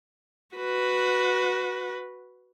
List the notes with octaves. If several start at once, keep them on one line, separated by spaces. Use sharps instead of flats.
F#4 B4